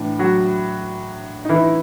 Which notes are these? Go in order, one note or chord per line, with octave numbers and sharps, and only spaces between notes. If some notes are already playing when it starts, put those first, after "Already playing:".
Already playing: A2 E3 D4
F#3 F#4
D#4
E3 E4